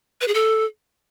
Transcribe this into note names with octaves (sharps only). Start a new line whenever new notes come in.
B4
G#4
A4